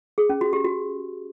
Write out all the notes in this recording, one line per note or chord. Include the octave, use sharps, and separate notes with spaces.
G#4
C#4
F#4
G4
F#4